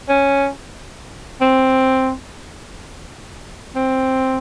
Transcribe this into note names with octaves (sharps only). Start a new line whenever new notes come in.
C#4
C4
C4